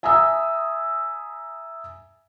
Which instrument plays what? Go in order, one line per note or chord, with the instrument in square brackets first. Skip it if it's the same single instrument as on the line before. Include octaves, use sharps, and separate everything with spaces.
[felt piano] E5 G#5 A#5 D#6 E6